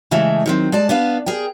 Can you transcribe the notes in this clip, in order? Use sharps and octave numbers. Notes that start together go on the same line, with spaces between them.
C#3 E3 G#3 A3
D#3 F#3 C4
G#3 D5 A5
B3 D4 B4 F5
G#4 A#4 G5